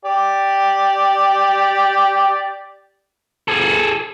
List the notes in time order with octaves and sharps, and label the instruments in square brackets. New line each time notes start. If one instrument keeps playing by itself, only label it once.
[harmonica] G4 D5
[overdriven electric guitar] G#4 A4